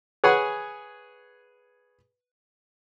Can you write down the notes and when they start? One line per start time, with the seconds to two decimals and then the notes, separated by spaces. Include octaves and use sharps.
0.24 G#4 B4 C#5 F#5 G#5